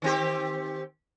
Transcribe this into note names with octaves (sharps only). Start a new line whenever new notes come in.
D#3 C4 G4